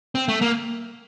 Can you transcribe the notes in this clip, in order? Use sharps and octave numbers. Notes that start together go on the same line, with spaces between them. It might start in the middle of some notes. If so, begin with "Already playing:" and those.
C4
A3
A#3